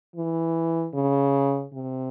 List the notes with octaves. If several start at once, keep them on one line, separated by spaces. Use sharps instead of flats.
E3
C#3
C3